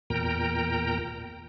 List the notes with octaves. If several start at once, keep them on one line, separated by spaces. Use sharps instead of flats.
E2 A#2 A#4 G5 A#5